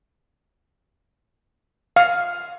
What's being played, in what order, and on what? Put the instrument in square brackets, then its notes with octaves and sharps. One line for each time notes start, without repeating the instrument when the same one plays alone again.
[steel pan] F5